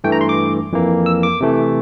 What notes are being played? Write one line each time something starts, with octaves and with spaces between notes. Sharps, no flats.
G2 E3 A3 G5
A#5
C6
D6
F2 E3 A#3
E6
D6
C3 E3 A3